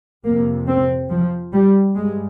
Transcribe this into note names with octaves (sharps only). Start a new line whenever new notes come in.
F2 C3 A#3
C4
F3
G3
G2 G#3